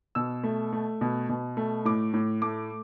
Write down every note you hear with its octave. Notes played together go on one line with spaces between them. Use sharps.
B2 E6
A3
A3
B2
B2
A3
A2 D6
A2
A3 D6